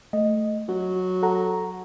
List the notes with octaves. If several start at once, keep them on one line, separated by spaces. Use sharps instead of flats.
A3 D#5
F#3 F#4
A4 F#5 A#5